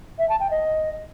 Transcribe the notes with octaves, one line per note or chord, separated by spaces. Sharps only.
E5
A5
G5
D#5